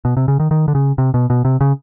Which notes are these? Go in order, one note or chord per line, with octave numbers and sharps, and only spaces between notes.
B2
C3
C#3
D#3
D#3
D3
C#3
C3
B2
B2
C3
C#3